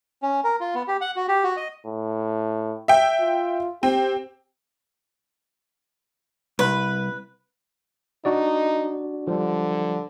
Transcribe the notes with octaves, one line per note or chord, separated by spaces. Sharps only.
C#4
A#4
F4
B3
G4
F#5
F#4
G4
F#4
D#5
A2
E5 G5
F4
C4 G4
C2 B4
D4 D#4 F#4 D5
D3 F3 G3